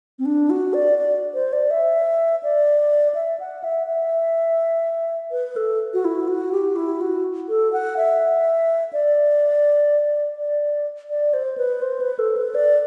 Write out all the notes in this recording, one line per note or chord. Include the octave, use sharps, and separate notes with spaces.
C4
D4
F#4
D5
D5
C5
D5
E5
D5
E5
F#5
E5
E5
B4
A4
F#4
E4
F#4
G4
E4
F#4
A4
F#5
E5
D5
D5
D5
C5
B4
C5
B4
A4
B4
D5